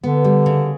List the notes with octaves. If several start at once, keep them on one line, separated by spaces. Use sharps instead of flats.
D3 B3
G3
C#3